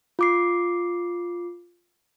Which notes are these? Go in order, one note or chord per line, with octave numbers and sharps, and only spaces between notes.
F4 D6 C7